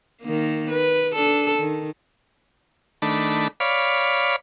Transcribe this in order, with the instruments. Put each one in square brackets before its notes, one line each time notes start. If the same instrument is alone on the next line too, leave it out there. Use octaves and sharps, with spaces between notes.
[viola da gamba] D#3 A#3
B4
D4 A4
D#3
[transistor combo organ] D#3 A3 D4 B5
C#5 D5 F5 B5